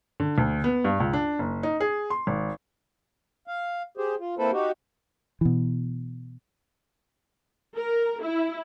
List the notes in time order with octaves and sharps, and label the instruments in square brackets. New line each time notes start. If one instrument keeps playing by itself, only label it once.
[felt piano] D3
D2
B3
G2
C#2
D4
F#1
D#4
G#4
C6
G#1
[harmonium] F5
G4 G#4 C5
F4
A#3 C4 E4 A4 B4 C5
D#4 F#4 G4
[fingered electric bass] B2 E3
[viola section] A#4
E4